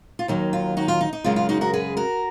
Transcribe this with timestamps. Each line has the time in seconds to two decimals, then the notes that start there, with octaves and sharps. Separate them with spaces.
0.19 F4
0.28 D#2 D#3 F#3 D#4
0.53 F4
0.77 D#4 F#4
0.88 F4
1.01 D#4
1.13 D#4
1.24 F#2 C#3 G#3 F4
1.36 F4
1.49 D#4 F#4
1.61 F#4 A#4
1.73 G#4 B4
1.97 F#4 A#4